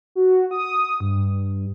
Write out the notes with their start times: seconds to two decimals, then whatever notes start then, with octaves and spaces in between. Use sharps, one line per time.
0.15 F#4
0.51 D#6
1.00 G2